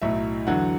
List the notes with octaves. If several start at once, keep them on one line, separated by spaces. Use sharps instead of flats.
B1 A2 F#3 E5
E2 D3 F#3 F#5